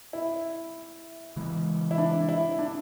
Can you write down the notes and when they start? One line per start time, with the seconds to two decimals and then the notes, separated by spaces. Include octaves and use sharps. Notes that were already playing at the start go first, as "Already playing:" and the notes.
0.13 E4
1.36 C#3 E3 G#3
1.91 E4
1.98 D4
2.29 E4
2.59 D4